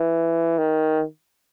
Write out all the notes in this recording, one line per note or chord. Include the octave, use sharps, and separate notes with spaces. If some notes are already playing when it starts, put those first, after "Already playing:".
Already playing: E3
D#3